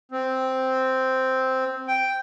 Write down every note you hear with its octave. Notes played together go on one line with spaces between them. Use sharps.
C4
G5